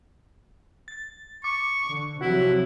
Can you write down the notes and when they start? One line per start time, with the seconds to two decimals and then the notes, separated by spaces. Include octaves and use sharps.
0.88 A6
1.44 C#6 D6
1.86 D3
2.21 C3 F3 F#3 E4 F#4